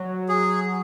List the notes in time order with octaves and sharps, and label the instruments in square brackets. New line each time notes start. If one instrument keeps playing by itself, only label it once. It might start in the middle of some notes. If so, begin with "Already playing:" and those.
Already playing: [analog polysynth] F#3
[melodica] G#4